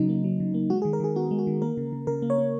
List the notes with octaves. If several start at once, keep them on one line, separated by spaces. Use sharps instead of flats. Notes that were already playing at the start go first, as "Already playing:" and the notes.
Already playing: C#3 F#3 D#4
A#3
F#3
C#3
A#3
G#3 F#4
G#4
D#3
A#4
D#3 G#4
B3 F#4
G#3
F#4
D#3
A#3 A#4
C#3
C#3
C#3 A#4
A#3
C#5
A#3